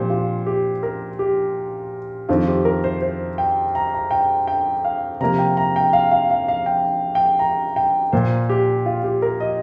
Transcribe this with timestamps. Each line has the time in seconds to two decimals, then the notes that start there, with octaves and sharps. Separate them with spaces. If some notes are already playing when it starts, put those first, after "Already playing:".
Already playing: A#2 F3 C4 G4 C5
0.10 F4
0.46 G4
0.83 A#4
1.19 G4
2.29 F2 D#3 C4 F4
2.47 G4
2.65 A#4
2.84 C5
3.02 C5
3.38 G5
3.75 A#5
3.94 A#5
4.11 G5
4.47 G5
4.84 F5
5.21 C3 F3 A#3 A#5
5.39 G5
5.57 A#5
5.76 G5
5.93 F5
6.11 F5
6.31 F5
6.48 F5
6.66 G5
7.15 G5
7.39 A#5
7.76 G5
8.13 A#2 A#3 C5
8.49 G4
8.86 F4
9.04 G4
9.22 A#4
9.40 D#5